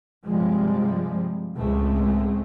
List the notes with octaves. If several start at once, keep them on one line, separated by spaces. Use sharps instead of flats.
G2 C3 F3 G3 G#3
C#2 A2 G#3 A3 C4